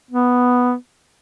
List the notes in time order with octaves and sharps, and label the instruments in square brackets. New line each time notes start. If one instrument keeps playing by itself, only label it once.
[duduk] B3